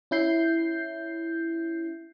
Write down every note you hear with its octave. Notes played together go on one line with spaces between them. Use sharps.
C#4 E4 G6 C7